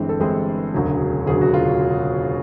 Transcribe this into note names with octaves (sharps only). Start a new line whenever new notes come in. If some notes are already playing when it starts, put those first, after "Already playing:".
Already playing: G1 G2 E3 G#3 C4
A4
G1 G2 E3 G#3 C4 G#4
E1 D2 C#3 F#3
E1 D2 C#3 F#3 G#4
F#4
F4